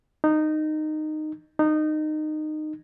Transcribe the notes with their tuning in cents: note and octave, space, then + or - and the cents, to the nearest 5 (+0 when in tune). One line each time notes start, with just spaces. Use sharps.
D#4 -15
D#4 -20